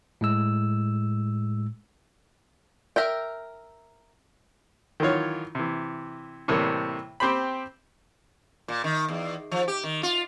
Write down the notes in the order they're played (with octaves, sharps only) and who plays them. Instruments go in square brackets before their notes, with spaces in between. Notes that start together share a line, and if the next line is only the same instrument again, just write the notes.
[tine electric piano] A2 G#3 E6
[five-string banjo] A#4 E5 G5
[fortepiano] D#3 E3 F#3 F4 C#5
C3 E3
A2 C3 E3 G3 A#3
C4 G4 C5 B5
[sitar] A#2
D#3
E2
F3
G4
D#3
F4